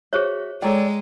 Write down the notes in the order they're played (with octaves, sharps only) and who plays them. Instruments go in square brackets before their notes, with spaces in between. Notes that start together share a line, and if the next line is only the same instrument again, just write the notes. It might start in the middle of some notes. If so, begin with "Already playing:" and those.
[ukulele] F#4 E5 [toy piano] G#4 C5 C#5
[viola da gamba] G#3 [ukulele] A4 C#5 D5 [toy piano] G5 A#5